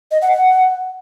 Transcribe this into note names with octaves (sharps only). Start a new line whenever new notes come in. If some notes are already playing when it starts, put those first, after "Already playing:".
D#5
F#5
F#5